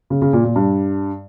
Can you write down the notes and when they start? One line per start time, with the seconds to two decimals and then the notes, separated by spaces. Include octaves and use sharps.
0.10 C#3
0.22 C#3
0.33 A#2
0.44 A#2
0.56 G2